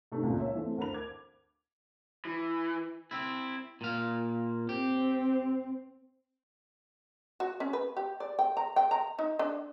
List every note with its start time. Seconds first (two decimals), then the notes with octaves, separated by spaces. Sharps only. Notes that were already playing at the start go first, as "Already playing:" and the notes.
0.12 C3 D#3 A3
0.23 C#2 A#2
0.40 C#5 E5
0.55 E3 A3 C4
0.78 D2 A#4 C5 B5 F7
0.94 D6 G#6
2.25 E3
3.11 C4 E4
3.81 A#2 F5
4.69 C4 G4
7.40 F#4
7.60 C#4
7.73 B4
7.97 G4
8.20 D5
8.39 G5
8.57 A#5
8.76 G5
8.91 A#5
9.19 D#4
9.39 D4